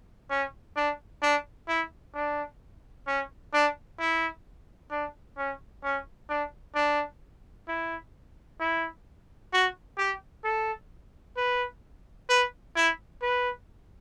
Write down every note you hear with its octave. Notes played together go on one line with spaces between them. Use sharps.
C#4
D4
D4
E4
D4
C#4
D4
E4
D4
C#4
C#4
D4
D4
E4
E4
F#4
G4
A4
B4
B4
E4
B4